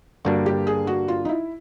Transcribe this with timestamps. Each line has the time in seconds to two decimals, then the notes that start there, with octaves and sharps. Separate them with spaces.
0.25 G2 D3 G3 A#3 D4 F#4
0.46 G4
0.67 G#4
0.87 F#4
1.08 F4
1.25 D#4
1.29 E4